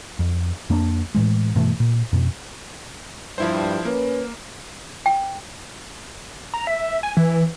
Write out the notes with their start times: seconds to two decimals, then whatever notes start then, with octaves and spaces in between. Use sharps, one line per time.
0.19 F2
0.70 F2 A#3 C4 D4
1.15 A2 E3 G#3
1.55 G2 B2 E3 A3
1.80 A#2
2.12 F2 B2
3.38 G2 F3 E4 C5
3.85 A#3 C#4 B4
5.06 G5
6.54 A#5
6.67 E5
7.03 G#5
7.17 E3